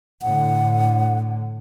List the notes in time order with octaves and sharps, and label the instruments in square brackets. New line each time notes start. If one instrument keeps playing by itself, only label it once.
[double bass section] A2 D3 [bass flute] F#5